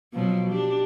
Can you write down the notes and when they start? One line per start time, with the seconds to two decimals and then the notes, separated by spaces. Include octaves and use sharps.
0.13 B2 F3 F#3
0.50 D4 G4